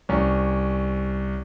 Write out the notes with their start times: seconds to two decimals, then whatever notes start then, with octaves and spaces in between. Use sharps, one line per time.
0.09 C2 C#4